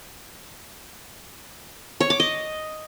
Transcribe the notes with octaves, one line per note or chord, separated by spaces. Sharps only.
C#5
D6
D#5